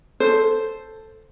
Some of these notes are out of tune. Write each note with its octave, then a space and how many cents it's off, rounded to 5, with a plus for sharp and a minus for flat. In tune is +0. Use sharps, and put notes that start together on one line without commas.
A4 +0 C5 +0